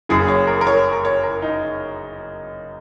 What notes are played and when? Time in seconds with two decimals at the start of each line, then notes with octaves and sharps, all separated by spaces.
0.09 F#1 F#2 C#3 G#4
0.28 C#5
0.47 A#4
0.61 A#4
0.67 C#5
0.93 A#4
1.05 C#5
1.23 A#4
1.42 D#4